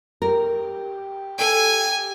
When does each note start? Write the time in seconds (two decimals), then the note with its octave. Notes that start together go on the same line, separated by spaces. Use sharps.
0.22 G4 A#4
1.38 A4 G5 G#5